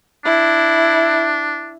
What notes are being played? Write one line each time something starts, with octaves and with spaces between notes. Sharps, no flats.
D4 E4